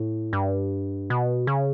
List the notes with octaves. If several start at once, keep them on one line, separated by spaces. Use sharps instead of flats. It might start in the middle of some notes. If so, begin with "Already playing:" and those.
Already playing: A2
G2
B2
C#3